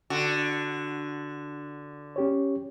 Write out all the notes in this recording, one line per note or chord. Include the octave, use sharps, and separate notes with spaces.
D3 F#4
C#4 G4 C#5